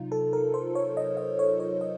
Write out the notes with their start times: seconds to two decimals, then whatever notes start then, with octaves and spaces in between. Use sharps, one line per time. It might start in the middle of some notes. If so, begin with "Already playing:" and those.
Already playing: C3 F#3 D#4 F4
0.12 A4
0.33 A#4
0.54 C5
0.75 C#5
0.97 D#5
1.17 D#5
1.39 C#5
1.60 C#5
1.81 D#5